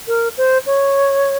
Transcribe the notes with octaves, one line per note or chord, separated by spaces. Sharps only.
A#4
C5
C#5